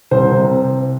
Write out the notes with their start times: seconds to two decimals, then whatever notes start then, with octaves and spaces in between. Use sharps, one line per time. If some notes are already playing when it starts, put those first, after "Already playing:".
0.11 C2 C5
0.31 C3